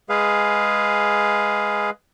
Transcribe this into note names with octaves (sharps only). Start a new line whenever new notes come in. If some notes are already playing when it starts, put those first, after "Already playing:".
G#3 G#4 B4 F5